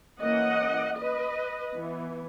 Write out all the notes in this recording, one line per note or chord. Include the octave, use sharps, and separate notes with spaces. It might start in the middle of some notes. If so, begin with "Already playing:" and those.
E3 A#3 C#4 D#5 F#5
B4 D#5
E3 B3